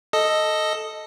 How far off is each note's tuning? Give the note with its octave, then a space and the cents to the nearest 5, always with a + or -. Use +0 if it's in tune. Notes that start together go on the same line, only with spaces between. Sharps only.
A4 +0 D#5 +0